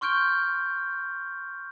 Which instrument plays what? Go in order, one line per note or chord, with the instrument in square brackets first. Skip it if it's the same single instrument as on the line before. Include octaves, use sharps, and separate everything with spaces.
[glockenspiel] C6 C#6 F6 G6 D7 G7